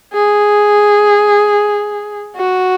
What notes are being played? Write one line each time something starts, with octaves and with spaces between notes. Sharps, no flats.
G#4
F#4